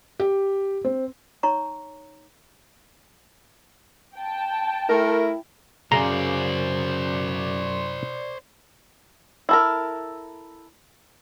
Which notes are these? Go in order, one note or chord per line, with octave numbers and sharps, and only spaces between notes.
G4
C4
D#4 C#5 A#5 C#6
G5 A5
A3 E4 A#4
F#2 C#3 C5 D5 A#5
E4 A4 A#4